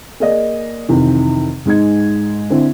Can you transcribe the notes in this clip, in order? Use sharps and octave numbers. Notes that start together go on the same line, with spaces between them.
A#3 G#4 D5 D#5
F2 C3 D#3 E3
G#2 G#3 D#4 G#6
D3 C4 E4